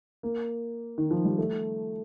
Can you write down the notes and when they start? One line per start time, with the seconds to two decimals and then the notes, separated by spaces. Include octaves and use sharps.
0.23 A#3
0.98 D#3
1.11 F3
1.25 G3
1.38 A3